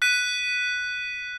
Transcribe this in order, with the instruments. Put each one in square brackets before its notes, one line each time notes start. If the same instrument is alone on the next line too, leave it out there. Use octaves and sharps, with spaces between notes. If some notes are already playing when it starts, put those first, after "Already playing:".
[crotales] F#6 B6 D#7